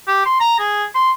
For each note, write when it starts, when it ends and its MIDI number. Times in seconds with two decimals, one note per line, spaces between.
0.08 0.24 67
0.26 0.36 84
0.40 0.57 82
0.59 0.84 68
0.95 1.11 84